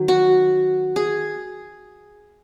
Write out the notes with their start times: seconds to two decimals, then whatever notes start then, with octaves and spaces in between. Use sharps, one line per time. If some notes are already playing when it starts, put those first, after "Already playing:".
Already playing: D#3 F#3
0.08 F#4
0.96 G#4